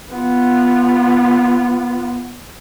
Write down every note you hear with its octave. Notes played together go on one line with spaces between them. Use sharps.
B3 F4